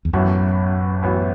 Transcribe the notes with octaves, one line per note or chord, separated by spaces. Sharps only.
E2
A1 F#2 A2 E3 B3 F#4
A1 A2 E3 B3 F#4